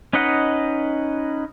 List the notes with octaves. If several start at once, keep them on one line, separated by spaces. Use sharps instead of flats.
C#4 D#4 B4 D#5 F#5